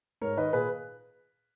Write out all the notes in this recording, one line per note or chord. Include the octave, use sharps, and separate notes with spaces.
G#2 A#4 C#5
D#3 B4 D#5
A#2 G#4 B4